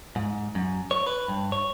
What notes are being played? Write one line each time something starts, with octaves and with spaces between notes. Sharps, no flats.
G#2
F#2
C#5
B4
G2
C#5